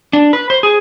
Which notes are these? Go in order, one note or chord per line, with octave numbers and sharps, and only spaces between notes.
D4
B4
C5
G#4